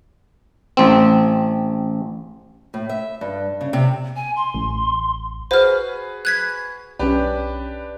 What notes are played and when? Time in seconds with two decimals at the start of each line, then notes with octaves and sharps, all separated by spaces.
0.77 A1 C4
2.74 A2
2.89 E5
3.21 G2
3.61 C#3
3.73 C3
4.16 G#5
4.36 C6
4.54 A1
5.51 F#4 G#4 B4 C5 F6
6.25 F#6 G#6 B6
6.99 B1 C#4 D4 G4 B4